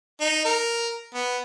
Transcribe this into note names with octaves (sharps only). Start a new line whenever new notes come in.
D#4
A#4
B3